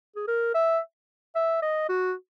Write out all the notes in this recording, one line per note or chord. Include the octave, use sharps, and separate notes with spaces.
G#4
A#4
E5
E5
D#5
F#4